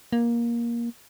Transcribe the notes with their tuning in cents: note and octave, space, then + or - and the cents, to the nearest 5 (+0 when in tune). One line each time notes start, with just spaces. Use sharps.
A#3 +15